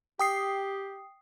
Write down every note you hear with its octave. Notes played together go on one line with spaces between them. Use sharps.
G4 G5 D#6 C7